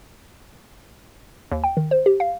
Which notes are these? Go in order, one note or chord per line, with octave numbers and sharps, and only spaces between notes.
D#2
G5
D#3
C5
G4
F5